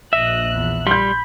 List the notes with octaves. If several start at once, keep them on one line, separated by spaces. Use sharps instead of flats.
A#1 D#5 E5 F#6
E2
G3 B5 C6 G6